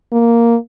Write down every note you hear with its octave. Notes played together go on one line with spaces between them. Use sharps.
A#3